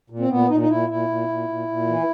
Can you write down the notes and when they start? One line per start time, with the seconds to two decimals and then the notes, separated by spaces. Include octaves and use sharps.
0.10 A#2
0.19 C4
0.29 A#2 B3
0.49 A#2 D#4
0.60 D#4
0.69 A#2 E4
0.89 A#2 E4
1.08 A#2
1.28 A#2
1.48 A#2
1.67 A#2
1.87 E3